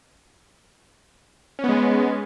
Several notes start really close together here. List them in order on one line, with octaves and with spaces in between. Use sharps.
C#4 B3 G#3